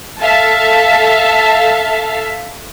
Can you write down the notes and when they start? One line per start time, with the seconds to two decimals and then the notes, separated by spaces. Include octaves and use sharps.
0.21 A4 E5 F5 A5